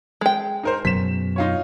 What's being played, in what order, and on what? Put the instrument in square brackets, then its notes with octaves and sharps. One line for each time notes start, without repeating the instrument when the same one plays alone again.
[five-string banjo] G#3 G5
[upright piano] D#4 A#4 C5
[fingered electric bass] F#2 B2 F#3 [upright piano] B6 E7
[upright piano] D#4 F4 C#5